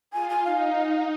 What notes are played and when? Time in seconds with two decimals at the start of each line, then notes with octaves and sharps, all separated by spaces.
0.13 F4 G#5
0.29 G#5
0.45 D#4 F5